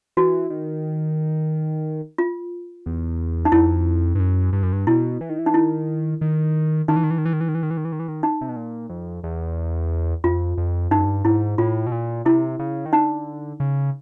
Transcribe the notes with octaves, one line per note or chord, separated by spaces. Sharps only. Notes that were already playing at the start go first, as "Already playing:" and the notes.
E3 F#4
D#3
F4
E2
D#4
F2 E4
G2
F#2
G2
F#2
G2
B2 E4
E3
D#3
E3
D#4
D#3 E4
D#3
D#3 D#4
E3
D#3
E3
D#3
E3
D#3
E3
D#3
E3
D#3
E3
D#3
E3
D#3
E3
D#3
D#4
C3
B2
A#2
F2
E2
F2 F4
F2
G2 D#4
F#2
G2
G#2 E4
A2 F4
B2
A#2
C3 E4
C#3
D#3
D3 D#4
C#3